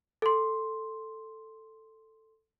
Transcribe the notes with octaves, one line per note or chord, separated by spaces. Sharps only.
A4 C6